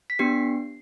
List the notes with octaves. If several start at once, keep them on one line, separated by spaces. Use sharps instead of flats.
B6
B3 D4 G4 C7